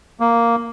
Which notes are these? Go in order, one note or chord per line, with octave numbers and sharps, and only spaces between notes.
A#3